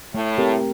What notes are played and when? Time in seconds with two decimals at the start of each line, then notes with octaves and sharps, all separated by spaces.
0.14 A2 A3
0.38 C4 G4 A#4